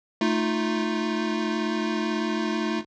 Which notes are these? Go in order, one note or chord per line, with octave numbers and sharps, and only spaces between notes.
A3 D#4 F4